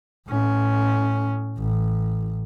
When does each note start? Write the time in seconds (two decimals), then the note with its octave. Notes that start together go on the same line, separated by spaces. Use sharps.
0.27 A2 C#4
1.58 A1